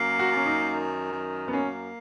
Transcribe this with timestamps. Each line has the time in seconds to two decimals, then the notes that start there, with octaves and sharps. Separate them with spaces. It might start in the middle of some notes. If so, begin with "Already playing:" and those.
Already playing: F#2 A#3
0.19 F#4
0.32 F#2 C#4
0.46 D#4
0.72 D#3
1.13 F#2
1.48 B3
1.52 A#3 C#4